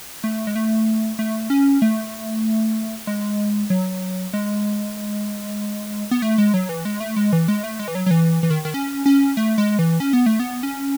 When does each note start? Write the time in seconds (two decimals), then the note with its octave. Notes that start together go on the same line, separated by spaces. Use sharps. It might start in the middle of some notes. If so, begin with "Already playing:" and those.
0.24 A3
0.47 G#3
0.56 A3
1.19 A3
1.50 C#4
1.82 A3
3.07 G#3
3.70 F#3
4.33 G#3
6.11 B3
6.22 A3
6.38 G#3
6.54 F#3
6.69 E3
6.85 G#3
7.00 A3
7.16 G#3
7.33 E3
7.48 G#3
7.64 A3
7.79 G#3
7.88 E3
7.95 F#3
8.06 F#3
8.11 E3
8.43 E3
8.50 D#3
8.65 D#3
8.74 C#4
9.06 C#4
9.37 A3
9.58 G#3
9.79 E3
10.00 C#4
10.13 B3
10.26 A3
10.40 B3
10.63 C#4